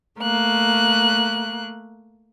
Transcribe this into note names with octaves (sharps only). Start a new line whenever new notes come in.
A3 A#3 F#6